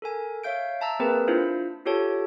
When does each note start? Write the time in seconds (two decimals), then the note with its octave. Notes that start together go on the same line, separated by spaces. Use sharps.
0.02 A4 A#4 G#5
0.44 C#5 E5 F5 G6 D7
0.80 E5 A5 A#5 E6
0.99 A#3 C4 G#4 A#4 B4
1.28 D4 E4 F4 C5
1.85 F4 G4 A4 C#5 A5